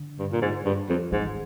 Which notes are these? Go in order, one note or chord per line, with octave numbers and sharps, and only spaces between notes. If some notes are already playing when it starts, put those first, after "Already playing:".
Already playing: D3
G2
A#2
G#2
G2
F2
G#2 D#3